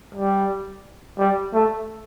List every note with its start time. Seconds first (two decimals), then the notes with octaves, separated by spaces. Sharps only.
0.15 G3
1.19 G3
1.54 A3